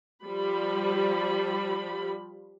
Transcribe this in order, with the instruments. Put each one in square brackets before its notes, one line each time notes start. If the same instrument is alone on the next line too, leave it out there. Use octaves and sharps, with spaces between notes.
[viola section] F3 G3 B5